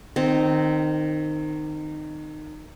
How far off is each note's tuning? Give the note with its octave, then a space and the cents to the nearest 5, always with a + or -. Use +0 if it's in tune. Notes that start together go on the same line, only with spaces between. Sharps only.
D#3 -20 C4 -5